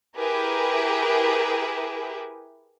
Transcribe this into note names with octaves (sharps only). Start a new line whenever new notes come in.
E4 G4 G#4 A#4 B4